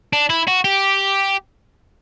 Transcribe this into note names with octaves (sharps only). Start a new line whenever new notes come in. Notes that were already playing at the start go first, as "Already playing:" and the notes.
D4
E4
F#4
G4